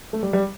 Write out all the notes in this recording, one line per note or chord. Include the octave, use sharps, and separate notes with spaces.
A3
G3
G3